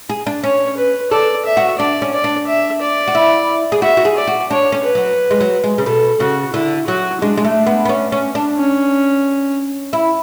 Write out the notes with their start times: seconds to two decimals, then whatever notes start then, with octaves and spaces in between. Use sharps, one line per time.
0.09 G#4
0.27 D4
0.44 C#4 C#5
0.77 B4
1.11 A4 D5
1.45 E5
1.57 F#4
1.79 D4 D5
2.02 C#4
2.13 D5
2.24 D4
2.47 E5
2.81 D5
3.07 F#4
3.15 E4
3.72 G#4
3.82 F#4 E5
3.97 F#4
4.05 G#4
4.17 D5
4.27 F#4
4.51 D4 C#5
4.72 C#4
4.84 B4
4.95 F#3
5.31 G#3
5.40 F#3
5.64 G#3
5.78 C#3
5.86 B2 A4
6.20 C#3 F#4
6.53 D3 E4
6.87 F#3 F#4
7.22 G#3 D4
7.37 G#3
7.45 A3
7.67 B3
7.85 B3
7.89 C#4
8.12 C#4
8.35 D4
8.57 C#4
9.93 E4